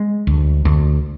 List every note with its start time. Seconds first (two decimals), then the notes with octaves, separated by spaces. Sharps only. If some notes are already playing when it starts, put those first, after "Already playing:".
Already playing: G#3
0.27 D2
0.65 D2